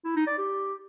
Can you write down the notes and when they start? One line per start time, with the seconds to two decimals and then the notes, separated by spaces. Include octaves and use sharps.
0.05 E4
0.16 D#4
0.27 D5
0.38 G4